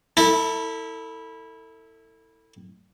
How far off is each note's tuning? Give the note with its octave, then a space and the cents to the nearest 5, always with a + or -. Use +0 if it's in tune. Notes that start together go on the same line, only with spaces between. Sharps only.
E4 -20 A4 +30